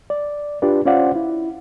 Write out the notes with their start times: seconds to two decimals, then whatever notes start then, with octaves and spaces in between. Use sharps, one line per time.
0.10 D5
0.62 D4 F4 G4 B4 D5
0.85 C#4 F4 C5 D5 F5 F#5
1.15 E4